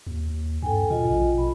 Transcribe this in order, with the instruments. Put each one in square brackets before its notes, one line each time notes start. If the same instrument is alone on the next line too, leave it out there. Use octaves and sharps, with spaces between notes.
[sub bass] D#2
[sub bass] G2 [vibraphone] A4 G5 G#5
[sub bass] B2 [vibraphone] F4 D#5
[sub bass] A#1
[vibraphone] B5